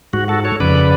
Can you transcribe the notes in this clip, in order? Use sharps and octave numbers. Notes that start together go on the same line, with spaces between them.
G#2 F#4
F#4 A4
A4 C#5
F2 C#3 B4 D5